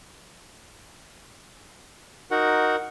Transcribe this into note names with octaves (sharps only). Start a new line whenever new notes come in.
D#4 F#4 A#4 F#5